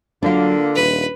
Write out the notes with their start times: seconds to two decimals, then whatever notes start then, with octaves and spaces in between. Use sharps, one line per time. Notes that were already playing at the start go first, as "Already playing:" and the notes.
0.23 D3 F#3 A#3 D4 F4
0.75 D#1 B4